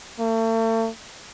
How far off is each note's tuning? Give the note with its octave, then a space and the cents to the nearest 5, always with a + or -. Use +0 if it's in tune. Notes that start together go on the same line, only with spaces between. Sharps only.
A3 +40